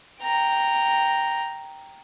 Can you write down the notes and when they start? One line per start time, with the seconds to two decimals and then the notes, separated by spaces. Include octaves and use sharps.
0.22 G5 A#5